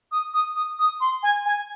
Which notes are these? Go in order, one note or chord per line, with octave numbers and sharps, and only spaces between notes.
D#6
D#6
D#6
D#6
C6
G#5
G#5